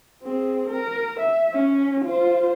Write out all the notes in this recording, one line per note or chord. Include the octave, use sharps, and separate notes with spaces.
C4 G#4
A#4
E5
C#4
F4 C5